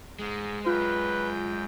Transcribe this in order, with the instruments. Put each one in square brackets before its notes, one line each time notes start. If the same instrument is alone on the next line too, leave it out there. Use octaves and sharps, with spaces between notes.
[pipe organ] G#2 [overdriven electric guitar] G#3
[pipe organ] F#2 G5 [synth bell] F4 [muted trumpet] B4